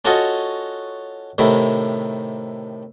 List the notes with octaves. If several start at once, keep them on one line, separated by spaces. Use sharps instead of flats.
C#4 F4 F#4 A4 C#5 D#5
A2 C3 D#3 E4